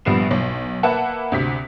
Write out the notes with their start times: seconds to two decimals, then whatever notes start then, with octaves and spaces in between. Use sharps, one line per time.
0.05 A#1 G3 B3 C7 E7
0.31 B1
0.83 A#3 B4 E5 F#5 A5
1.32 D2 C3 B6